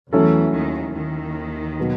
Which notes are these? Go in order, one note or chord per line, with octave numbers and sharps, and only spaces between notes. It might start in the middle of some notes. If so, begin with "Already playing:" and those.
E2 E3 F#3 A3 C#4 E4 A4
D#2 D#3
D#2 D#3
B2 F#3